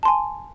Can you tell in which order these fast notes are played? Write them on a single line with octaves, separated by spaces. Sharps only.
A5 C6 G#5